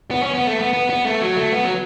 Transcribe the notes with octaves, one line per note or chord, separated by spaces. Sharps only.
B3
C#4
B3
A3
B3
B3
B3
A3
F#3
A3
B3
F#3